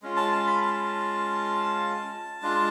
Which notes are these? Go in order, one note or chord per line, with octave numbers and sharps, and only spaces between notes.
G#3 C#4 F4
A5
A5
B5
A5
G#3 D4 F4